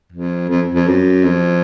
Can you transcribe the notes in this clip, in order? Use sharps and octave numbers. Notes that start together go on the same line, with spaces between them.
F2
F2
F2
F#2
F2